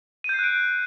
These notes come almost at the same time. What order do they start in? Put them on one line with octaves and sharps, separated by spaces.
D#7 G6 C7 F#6 D7